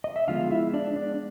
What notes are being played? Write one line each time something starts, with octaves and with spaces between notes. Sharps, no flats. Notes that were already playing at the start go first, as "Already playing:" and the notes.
D#5
E5
D3 F3 G#3 B3 F4 F5
E4 E5
D4 D5
D4 D5